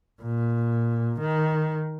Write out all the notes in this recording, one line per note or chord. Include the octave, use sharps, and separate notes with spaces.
A#2
D#3